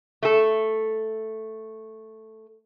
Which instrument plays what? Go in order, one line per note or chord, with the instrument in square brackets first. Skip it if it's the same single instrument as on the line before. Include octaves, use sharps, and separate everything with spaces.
[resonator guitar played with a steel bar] A3 A4